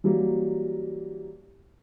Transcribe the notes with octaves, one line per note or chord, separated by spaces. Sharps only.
E3 F#3 G3 A#3